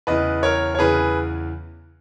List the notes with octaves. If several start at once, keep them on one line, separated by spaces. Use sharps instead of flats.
E2 C#3 E3 B4 D#5
A#4 C#5
C#5
E2 C#3 E3 G#4 B4